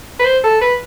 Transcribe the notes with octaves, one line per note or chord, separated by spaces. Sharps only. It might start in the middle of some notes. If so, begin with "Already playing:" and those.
B4
C5
A4
B4